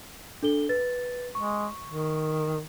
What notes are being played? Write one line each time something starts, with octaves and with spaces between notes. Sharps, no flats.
D4 A4 G7
B4 A6
G#3 C#6
D#3